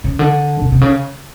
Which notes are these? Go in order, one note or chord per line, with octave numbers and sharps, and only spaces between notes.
C#3
D3
C3
C3
C#3